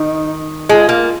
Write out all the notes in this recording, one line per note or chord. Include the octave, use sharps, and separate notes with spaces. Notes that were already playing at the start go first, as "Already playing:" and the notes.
Already playing: D#3 D#4
G#3 F4
A#3